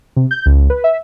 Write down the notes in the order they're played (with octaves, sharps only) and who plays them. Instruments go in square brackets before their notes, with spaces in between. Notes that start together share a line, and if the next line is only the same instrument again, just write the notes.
[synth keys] C3
G6
C#2
B4
E5